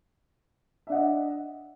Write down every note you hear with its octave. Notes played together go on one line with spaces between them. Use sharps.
D4 D#5 E5 F#5